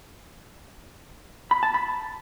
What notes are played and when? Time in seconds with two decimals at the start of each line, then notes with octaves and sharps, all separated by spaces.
1.51 B5
1.63 A5
1.74 B5